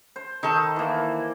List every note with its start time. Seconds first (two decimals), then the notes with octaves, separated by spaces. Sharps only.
0.16 C5
0.43 D#3 D#4 A4
0.76 E3 A#3